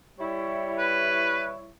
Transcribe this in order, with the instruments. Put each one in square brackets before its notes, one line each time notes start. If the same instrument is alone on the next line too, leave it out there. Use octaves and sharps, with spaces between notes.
[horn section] G3 E4 C#5
[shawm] B4